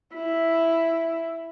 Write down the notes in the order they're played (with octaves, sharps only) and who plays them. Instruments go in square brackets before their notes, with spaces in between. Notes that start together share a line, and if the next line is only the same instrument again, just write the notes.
[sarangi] E4